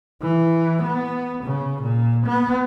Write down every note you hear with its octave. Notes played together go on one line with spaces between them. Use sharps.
E3
B3
C#3
A#2
B3